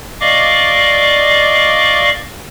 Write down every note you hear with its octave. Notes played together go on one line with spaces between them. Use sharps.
D5 D#5 F5 C#6 D6